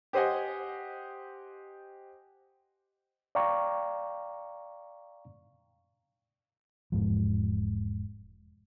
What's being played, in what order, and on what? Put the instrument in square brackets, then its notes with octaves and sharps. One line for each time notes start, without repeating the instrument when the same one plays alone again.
[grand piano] G4 C5 D#5 F#5 G#5
[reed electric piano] D5 F5 G5 A#5 C#6 D6
[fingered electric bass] E1 G#2 F3